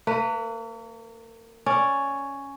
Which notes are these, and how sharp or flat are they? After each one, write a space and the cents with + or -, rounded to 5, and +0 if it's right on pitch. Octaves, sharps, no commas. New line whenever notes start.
A#3 -40 B4 +0
C#4 +0 D5 +0